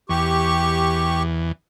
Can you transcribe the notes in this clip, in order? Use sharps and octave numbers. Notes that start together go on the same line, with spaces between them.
E2 G4 C#6